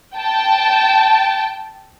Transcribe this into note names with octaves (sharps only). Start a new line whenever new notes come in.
G5 A5